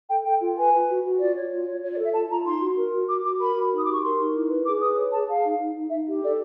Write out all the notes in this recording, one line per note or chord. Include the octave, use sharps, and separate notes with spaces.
A4 G5
A4 G5
F4
B4 G#5
B4
F#4
F#4
F4 D5
C#5
F4
C#5
F4 C#5
D5
A4 E5
F4 A5
F4 A#5
D#4 C6
F#4
A#4
F#4
F#4 D6
F#4 D6
A#4 B5
F#4
D#4
D#6
G4 D6
C#6
A#4 C6
D#4
E4
B4
G#4 D6
B4 D#6
C#5
G#4 A5
G#4 F5
D#4
D#4
D#4
D#4 E5
G4
A4 D5